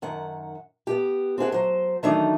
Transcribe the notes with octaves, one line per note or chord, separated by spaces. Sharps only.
F#2 D#3 F#5
B3 G4
C4 G4 G#4 F#5
F#3 C5
D#3 E3 F#3 A3 D4 D#4